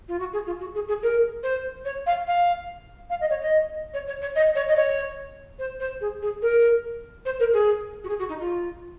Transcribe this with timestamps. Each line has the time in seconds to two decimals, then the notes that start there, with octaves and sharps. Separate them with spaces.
0.08 F4
0.19 F#4
0.33 G#4
0.46 F4
0.60 F#4
0.75 G#4
0.88 G#4
1.03 A#4
1.43 C5
1.85 C#5
2.07 F5
2.27 F5
3.10 F5
3.21 D#5
3.30 C#5
3.42 D#5
3.94 C#5
4.07 C#5
4.22 C#5
4.35 D#5
4.55 C#5
4.69 D#5
4.76 C#5
5.59 C5
5.80 C5
6.01 G#4
6.22 G#4
6.42 A#4
7.25 C5
7.40 A#4
7.53 G#4
8.04 F#4
8.09 G#4
8.19 F#4
8.29 D#4
8.40 F4